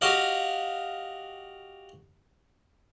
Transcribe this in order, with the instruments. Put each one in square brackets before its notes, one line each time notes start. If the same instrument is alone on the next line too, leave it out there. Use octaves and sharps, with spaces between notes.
[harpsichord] F#4 G4 D#5 F5